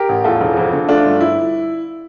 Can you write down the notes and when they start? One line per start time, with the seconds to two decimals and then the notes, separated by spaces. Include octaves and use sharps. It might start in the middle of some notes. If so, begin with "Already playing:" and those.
Already playing: G4 A#4
0.09 A1
0.24 E2 F4 A4
0.41 E1
0.57 F2
0.73 D3
0.89 A3 D4 F4
1.05 G1
1.21 E4